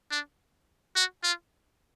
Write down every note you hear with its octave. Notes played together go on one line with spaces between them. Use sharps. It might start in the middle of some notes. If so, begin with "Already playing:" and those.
D4
F#4
F4